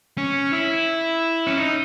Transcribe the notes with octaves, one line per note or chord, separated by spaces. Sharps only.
C#4
E4
C#4
D#4